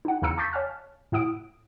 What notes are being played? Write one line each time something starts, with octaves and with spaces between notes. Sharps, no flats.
D#4 F#5
E2 C#3 F5 A#5 E6 C#7
A5 C#6 D6 G6 A6 B6
C#5 F5 G#5 A5 F6
A2 E4 F#5 D#6 D7